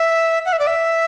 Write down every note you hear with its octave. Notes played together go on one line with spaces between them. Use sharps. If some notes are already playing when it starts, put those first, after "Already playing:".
Already playing: E5
F#5
E5
D5
E5